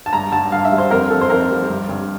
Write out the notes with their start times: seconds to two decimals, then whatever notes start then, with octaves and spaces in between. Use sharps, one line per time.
0.06 A5
0.13 G2 A#5
0.32 G2 A5
0.52 G2 F5
0.65 E5
0.72 G3
0.78 C5
0.91 F2 A#4
1.10 F2 A4
1.21 C5
1.30 F2 A#4
1.50 G3
1.69 G2
1.89 G2